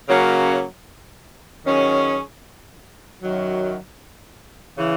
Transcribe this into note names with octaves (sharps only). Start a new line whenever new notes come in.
C#3 F#3 A#3 C#4 F#4
D#3 F#3 C#4 G#4
F#2 D#3 F#3
C#3 E3